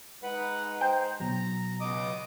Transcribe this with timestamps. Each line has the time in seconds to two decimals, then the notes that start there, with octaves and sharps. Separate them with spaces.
0.23 G#3 D#4 B4 F#5 B5
0.81 C5 G5
1.20 B2 F#3 A#5
1.80 C#2 B3 D#5 D6 D#6